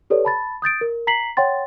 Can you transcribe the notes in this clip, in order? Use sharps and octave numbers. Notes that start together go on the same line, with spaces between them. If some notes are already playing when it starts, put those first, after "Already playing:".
G4 A4 B4 C#5 D5
A5 B5 A6
D#6 G6 A6 D7
A#4
A#5 B6 C7 F#7
C#5 F#5 G5 C6 A6